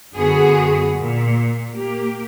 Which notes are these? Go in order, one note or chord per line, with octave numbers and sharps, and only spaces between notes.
F#2 D3 B3 F#4 G#4
A#2
A#3 G4